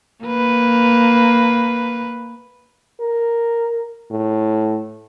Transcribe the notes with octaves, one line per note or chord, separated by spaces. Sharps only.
A#3 B4
A#4
A2